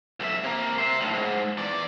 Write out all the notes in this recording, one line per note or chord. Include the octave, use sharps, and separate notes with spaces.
B1 E5
C3 A#3
C5 E5
D2 A2
G#2
E2 D5